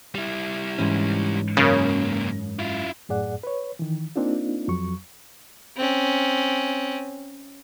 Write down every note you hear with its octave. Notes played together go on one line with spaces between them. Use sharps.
G3 E4
G#2 E3 C#4
C#2 F#2 C#3 A#3
E4 F4
F#2 A2 G#4 D5 F#5
B4 C#5
D#3 E3
A#3 C4 D4 D#4 F4
F2 F#3 C#6
C4 C#4